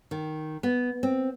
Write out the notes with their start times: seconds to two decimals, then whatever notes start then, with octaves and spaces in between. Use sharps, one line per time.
0.11 D#3
0.63 B3
1.03 C4